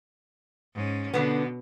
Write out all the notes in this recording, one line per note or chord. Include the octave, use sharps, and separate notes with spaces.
G#2 C#4
B2 D3 B3